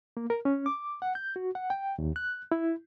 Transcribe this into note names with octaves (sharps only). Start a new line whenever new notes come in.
A#3
A#4
C#4
D6
F#5
G6
F#4
F#5
G5
D#2
F#6
E4